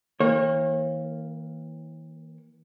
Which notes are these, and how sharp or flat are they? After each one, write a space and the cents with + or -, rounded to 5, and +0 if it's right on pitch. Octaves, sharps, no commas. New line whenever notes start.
E3 -45 A#3 +0 C#5 -40